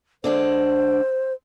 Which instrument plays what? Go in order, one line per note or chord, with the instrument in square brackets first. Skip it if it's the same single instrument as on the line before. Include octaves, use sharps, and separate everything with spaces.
[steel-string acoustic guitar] D3 G#3 D4 [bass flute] C5